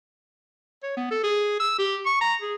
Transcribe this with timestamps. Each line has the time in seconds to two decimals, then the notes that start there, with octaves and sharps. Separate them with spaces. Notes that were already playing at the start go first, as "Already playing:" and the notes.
0.83 C#5
0.97 B3
1.11 A4
1.23 G#4
1.59 E6
1.79 G4
2.06 C#6
2.21 A#5
2.41 G#4